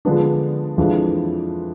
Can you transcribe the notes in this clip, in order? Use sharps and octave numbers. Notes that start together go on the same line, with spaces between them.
D3 F3 G#3 B3 D4
F2 E3 G#3 D4 F4